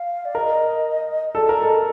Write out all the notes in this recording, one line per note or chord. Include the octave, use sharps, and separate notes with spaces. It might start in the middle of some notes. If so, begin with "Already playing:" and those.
Already playing: F5
D5
A#4 D#5
A4 D5
A#4
A4 D#5